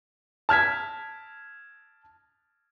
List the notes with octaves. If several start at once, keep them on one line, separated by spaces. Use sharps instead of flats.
A5 F6 G#6 B6